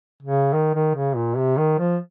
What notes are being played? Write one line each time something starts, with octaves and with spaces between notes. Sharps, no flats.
C#3
D#3
D#3
C#3
A#2
C3
D#3
F3